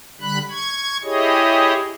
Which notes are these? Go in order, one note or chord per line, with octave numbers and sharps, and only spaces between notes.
D3 G3 B5 F#6
C#6 G#6
E4 G4 G#4 C#5 D#5